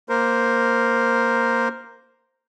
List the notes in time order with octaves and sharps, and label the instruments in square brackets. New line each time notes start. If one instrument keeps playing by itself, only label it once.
[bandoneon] A#3 A#4 C5